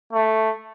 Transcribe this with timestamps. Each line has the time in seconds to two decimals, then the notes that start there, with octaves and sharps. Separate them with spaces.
0.13 A3